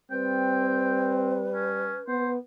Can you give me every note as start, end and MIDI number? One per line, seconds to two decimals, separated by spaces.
0.11 1.95 55
0.11 1.55 60
0.11 2.39 71
0.11 1.14 79
1.54 1.98 61
2.08 2.37 59
2.08 2.30 72